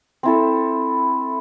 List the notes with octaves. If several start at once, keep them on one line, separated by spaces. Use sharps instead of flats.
C4 E4 A4